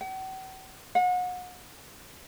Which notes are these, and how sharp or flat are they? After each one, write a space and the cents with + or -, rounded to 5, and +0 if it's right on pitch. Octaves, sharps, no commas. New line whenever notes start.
F#5 +45
F#5 -35